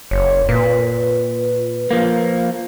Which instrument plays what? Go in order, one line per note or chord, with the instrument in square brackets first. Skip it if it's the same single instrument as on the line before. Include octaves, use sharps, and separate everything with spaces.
[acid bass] F#1 [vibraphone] C#5
[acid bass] A#2 [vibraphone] B4
[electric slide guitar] F3 A#3